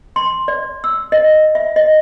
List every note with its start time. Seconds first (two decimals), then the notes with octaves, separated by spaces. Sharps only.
0.16 C6
0.48 D5
0.84 E6
1.12 D#5
1.55 E5
1.76 D#5